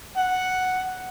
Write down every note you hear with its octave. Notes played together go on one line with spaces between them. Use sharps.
F#5